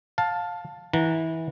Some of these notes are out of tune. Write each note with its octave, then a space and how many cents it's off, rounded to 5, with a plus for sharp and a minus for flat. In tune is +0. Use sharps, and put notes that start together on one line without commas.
F5 +15 A5 +0
E3 -25 F#5 -20 A#5 +0